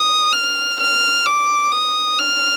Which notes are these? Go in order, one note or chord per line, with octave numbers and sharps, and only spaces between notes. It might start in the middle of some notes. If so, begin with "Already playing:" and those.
Already playing: D#6
F6
F6
D6
D#6
F6